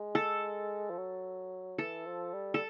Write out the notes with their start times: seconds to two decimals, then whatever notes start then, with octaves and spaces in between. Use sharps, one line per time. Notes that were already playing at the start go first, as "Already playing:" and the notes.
Already playing: G#3
0.15 A4
0.90 F3
0.98 F#3
1.78 E3 A4
2.06 F3
2.34 G3
2.54 A4